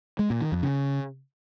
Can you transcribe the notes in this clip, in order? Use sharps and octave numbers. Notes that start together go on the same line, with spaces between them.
G#3
A#2
D#3
F2
C#3